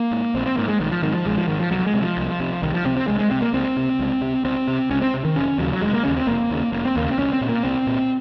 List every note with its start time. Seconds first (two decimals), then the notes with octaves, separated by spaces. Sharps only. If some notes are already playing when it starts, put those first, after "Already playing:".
Already playing: A#3
0.11 G#2
0.34 A#1 C4
0.46 C4
0.57 G#2 A#3
0.68 G#3
0.80 A#1 D#3
0.91 F3
1.02 G#2 D#3
1.14 F3
1.25 A#1 G#3
1.37 F3
1.48 G#2 D#3
1.60 F3
1.71 C2 F#3
1.86 G#3
1.94 C3
2.02 F3
2.17 C2
2.40 C3
2.62 C2 D#3
2.74 F3
2.86 C3 C4
2.97 C4
3.08 C2 G#3
3.19 G#3
3.31 C3 C4
3.42 A#3
3.53 C#2 C4
3.76 C3
3.99 C#2
4.22 C3
4.44 C#2 C4
4.68 C3
4.90 C#2 C#4
5.01 C4
5.13 C3
5.25 D#3
5.36 F1 C#4
5.58 D#2 C#3 F#3
5.73 F#3
5.82 F1 G#3
5.93 A#3
6.04 D#2 C#3 C#4
6.17 C4
6.27 F1 A#3
6.50 D#2 C#3
6.72 F1 A#3
6.85 C4
6.96 D#2 C#3 A#3
7.11 C4
7.18 C2 C#4
7.33 C4
7.41 A#2
7.49 A#3
7.64 C2 C4
7.87 A#2